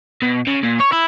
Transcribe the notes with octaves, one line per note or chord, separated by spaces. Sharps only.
B2
C#3
A#2
C#5
E4